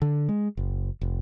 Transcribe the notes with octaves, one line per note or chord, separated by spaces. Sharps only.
D3
G#3
F#1
F1